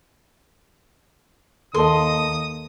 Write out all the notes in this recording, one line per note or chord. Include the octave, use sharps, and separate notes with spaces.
D#2 A4 A#4 D#5 A5 C6 D#6